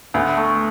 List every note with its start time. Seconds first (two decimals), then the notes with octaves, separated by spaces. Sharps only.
0.14 D2 B3
0.37 A3